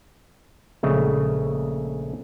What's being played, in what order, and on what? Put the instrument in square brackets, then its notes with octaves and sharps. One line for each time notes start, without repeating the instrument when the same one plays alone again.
[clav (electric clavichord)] A#1 C#3 G#3 A3